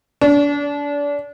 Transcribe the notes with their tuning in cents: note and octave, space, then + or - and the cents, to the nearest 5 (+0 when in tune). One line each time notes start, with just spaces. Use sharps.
D4 -30